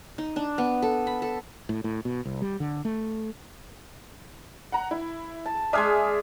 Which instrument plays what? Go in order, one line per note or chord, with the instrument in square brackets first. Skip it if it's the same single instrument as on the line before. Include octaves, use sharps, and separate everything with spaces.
[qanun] D#4
D4
B3
A4
B5
A4
[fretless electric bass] A2
A2
B2
C2
G3
D3
A3
[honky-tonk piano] F#5 A#5
E4
[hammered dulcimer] A5
[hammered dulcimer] G#3 G#4 D5 [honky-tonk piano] E5 D#6 F6